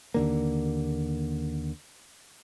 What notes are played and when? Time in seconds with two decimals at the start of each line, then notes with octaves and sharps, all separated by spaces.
0.14 D#2 D3 A#3